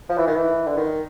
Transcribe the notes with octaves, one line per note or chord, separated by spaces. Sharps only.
F3
E3
D#3
E3
D3
D#3